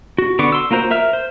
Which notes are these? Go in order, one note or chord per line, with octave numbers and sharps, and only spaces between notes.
F#4
D3 B3 C#6 D6
C6 E6
A#3 F4 F#4 A#4 C5
A#4 E5 F6
C5